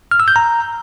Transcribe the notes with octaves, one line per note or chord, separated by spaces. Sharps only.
F6
E6
G6
A#5